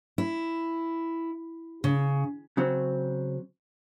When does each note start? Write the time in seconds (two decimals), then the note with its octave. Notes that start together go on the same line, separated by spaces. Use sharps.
0.18 E4
1.84 C#3
2.57 C#3 F#3 C4